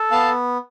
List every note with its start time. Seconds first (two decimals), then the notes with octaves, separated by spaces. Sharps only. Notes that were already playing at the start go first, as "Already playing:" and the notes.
Already playing: A4
0.11 B3 F5 A5